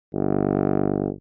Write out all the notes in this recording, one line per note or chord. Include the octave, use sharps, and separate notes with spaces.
G1